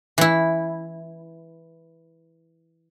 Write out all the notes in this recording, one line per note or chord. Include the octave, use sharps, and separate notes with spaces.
E3 E4